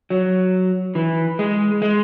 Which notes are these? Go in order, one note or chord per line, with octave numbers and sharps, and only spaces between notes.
F#3
E3
G#3
G#3